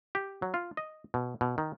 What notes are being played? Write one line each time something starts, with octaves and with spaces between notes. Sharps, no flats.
G4
F#3
F4
D#5
B2
B2
D#3